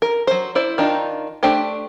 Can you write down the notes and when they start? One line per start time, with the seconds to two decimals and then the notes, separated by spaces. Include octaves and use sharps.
0.02 A#4
0.27 F#3 C5
0.55 E4 C5 D5
0.78 D#3 D4 D#4 F4
1.43 A3 D4 G4 C5